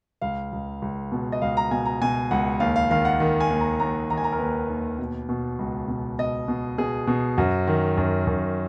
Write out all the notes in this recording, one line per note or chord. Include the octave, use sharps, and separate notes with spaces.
C#2 F5
C#2
C#2
B2
D#5
C#2 F5
A#5
B2 G#5
A#5
B2 G#5
C#2 F#5
D#2 F5
F5
D#3 F5
F#5
D#3
G#5
D#2
A#5
D#2 A#5
D#3 A#5
G#5
A#5
A#4
D#2 B4
D#2
B2
B2
C#2
B2
B2 D#5
B2
B2 G#4
B2
F#2 F#4
D#3
F#2
F#2